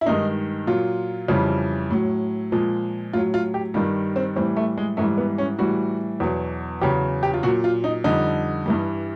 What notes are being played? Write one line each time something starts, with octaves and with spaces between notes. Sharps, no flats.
E4
G2 D#3 G#3 D#4
A#2 F#3 F4
F2 C#3 E3 G3
A2 F#3
A#2 F3 G#3
A2 F#3 F4
F4
G4
G2 D#3 G3 F4
C4
A2 E3 G3 C4
A3
G#3
G#2 E3 G3 A3
B3
C#4
A2 E3 G3 F#4
E2 B2 F#3
E2 C#3 F#3 G4
G4
F4
A#2 F#3 F#4
F4
D#4
F2 D3 G3 D#4
G2 E3 G3